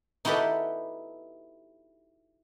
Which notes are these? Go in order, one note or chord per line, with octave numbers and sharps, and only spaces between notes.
D#4 E4 F#4 G4 A4 B4